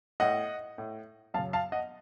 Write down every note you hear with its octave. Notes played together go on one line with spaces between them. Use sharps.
A2 D#5 F#5
A2
F#2 C#3 F5 A5
F5 A5
D#5 F#5